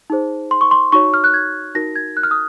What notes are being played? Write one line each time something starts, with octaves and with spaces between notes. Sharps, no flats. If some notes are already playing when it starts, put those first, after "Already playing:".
D#4 G#4 C5
C6
C#6
C6
D#4 F#4 C#5 C#6
F6
F#6
G#6
D#4 F#4 A#4 A#6
G#6
F#6
F6
D#6